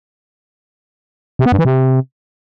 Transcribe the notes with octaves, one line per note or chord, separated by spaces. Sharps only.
C3
B3
G2
E3
C3